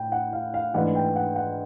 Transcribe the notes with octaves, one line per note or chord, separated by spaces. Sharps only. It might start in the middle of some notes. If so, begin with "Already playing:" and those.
Already playing: A2 G5
F#5
F5
F5
G#2 E3 A3 D4 F#5
G5
F#5
F#5